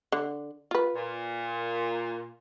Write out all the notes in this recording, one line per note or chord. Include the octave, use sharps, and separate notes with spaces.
D3
F4 B4
A#2